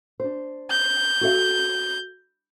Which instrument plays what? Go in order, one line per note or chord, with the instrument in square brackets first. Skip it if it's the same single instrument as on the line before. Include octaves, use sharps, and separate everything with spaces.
[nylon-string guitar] D4 C5
[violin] G6
[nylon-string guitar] F#4 A4 E5